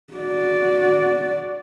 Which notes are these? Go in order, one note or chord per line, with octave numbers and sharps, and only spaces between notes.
F#4 D5